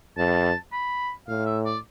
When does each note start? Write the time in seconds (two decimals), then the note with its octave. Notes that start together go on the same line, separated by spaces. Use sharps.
0.17 F2 A5
0.72 B5
1.28 A2 F5
1.46 E5
1.65 D5